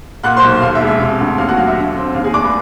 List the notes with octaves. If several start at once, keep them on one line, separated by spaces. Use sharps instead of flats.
A#2 F#5 F#6
C5 C6
B1
D#2 F5
E5
E1
E5
C3
D2
D#2 F5
F#4 F#5
F#3 F5
E5
D3
C4
D#2 F5
G#4 G#5
F1 D5 D6
B4 B5